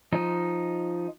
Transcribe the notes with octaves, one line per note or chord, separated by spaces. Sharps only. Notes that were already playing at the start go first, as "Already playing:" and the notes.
F3 D#4